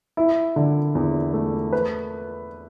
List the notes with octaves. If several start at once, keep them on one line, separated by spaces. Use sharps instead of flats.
E4
D3
E2
A3
B4